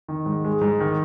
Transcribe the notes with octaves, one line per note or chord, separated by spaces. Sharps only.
D#3
G#2
G#3
G#2
D#3